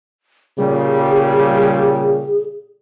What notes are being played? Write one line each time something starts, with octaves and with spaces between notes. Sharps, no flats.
A#2 C#3 G3 G#4